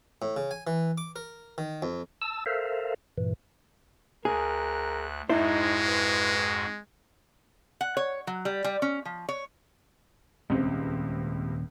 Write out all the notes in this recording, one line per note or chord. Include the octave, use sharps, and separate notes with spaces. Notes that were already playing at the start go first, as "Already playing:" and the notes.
A2
C#3
G#5
E3
D6
A#4
D#3
F2
A5 E6
A4 A#4 C5 E5 F5
G2 A#2 E3
D2 G#4 A#4 F#6
F2 G#2 G#3 D#4 E4 F#4 C5
B4
F#5
C#5
F#3
G3
G3
C#4
F3
C#5
D#1 C#2 C3 C4 C#4